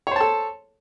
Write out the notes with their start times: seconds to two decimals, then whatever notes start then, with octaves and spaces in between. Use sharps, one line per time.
0.07 C#5
0.11 C5
0.16 A5
0.20 A4